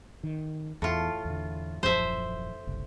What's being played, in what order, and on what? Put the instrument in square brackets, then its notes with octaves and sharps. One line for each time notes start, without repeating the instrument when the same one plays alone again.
[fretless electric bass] D#3
[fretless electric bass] E2 [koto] A2 F4
[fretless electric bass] E2 D3
[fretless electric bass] D#1 F#2 F3 [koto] C5 E5
[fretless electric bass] F#1 C2